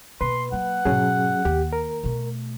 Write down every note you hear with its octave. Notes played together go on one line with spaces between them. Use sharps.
B2 A#3 B4 C6
F#3 A#3 F#5
G#2 B2 F#3 C#4 G#4
D#2 G4
A#4
B2 A3